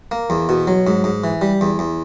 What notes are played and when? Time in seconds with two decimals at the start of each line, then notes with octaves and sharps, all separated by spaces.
0.11 A#3
0.30 E2
0.49 B2
0.67 F#3
0.87 G#2
1.04 G#2
1.24 E3
1.41 G3
1.61 E2
1.79 E2